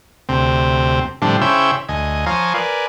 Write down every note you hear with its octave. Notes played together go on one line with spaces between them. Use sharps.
D2 C3 C4
A2 D3 F3 G3 C4 D4
C#3 E4 C5 C#5 G5 E6
D2 D#5 G#5
F3 C#5 F5 G#5 A#5 D#6
A#4 B4 D5 G#5